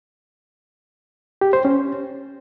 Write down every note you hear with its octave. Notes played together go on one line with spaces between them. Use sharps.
G4
C5
C#4